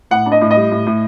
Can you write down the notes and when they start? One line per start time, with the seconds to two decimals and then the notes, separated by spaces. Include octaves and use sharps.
0.11 A2 F#5
0.26 D4
0.32 D#5
0.41 A2
0.51 D#5
0.56 G3
0.72 A2
0.87 A2